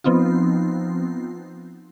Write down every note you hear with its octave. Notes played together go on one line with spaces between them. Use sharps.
F3 B3 C4 D#4 F4